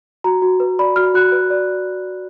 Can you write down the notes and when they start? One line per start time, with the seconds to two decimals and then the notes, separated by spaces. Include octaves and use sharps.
0.24 F#4 A#5
0.42 F#4
0.60 B4
0.79 D5 B5
0.96 F#4 F6
1.14 F#4 F#6
1.32 B4
1.50 D5